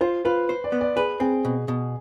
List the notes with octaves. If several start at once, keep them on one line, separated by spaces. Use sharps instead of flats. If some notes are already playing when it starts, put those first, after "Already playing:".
F4 C5
F4 B4
C5
D5
B3
D5
G#4 B4
C4 G#4
B2
B2